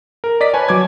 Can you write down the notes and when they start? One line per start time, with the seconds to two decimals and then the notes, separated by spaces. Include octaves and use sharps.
0.24 A#4
0.41 D5 D#5 B6
0.53 B4 C#5 G#5 A5
0.69 F#3 D6 G#6